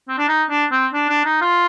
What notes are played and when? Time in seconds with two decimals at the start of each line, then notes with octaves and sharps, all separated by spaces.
0.08 C4
0.18 D4
0.28 D#4
0.50 D4
0.71 C4
0.93 D4
1.08 D4
1.25 D#4
1.41 F4